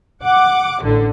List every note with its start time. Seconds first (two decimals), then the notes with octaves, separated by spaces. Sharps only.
0.23 F#5 D6
0.82 A1 D3